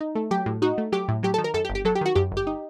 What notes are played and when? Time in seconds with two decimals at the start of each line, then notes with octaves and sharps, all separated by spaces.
0.01 D#4
0.15 A3
0.31 F#3 G4
0.46 A2
0.62 D#4 F#4
0.78 A3
0.92 F#3 G4
1.08 A2
1.23 F#3 G4
1.34 A4
1.38 D#3
1.44 A#4
1.54 F#2 A4
1.65 G4
1.69 G1
1.75 G4
1.85 F#3 A4
1.95 G4
2.01 D#3 F#4
2.15 F#2 G4
2.32 G1
2.37 G4
2.47 D#4